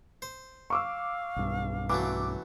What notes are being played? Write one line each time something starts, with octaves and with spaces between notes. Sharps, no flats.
C5
F5 C#6 D6 E6
B1 G2
E3 F#3 A3 D6